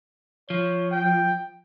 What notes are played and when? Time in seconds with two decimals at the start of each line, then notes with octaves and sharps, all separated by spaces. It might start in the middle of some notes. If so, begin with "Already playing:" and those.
0.50 F3 C#5
0.91 G5